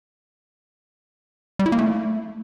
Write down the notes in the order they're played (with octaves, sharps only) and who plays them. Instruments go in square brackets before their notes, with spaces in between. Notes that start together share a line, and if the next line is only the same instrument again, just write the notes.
[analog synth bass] G3
E4
A#3
A3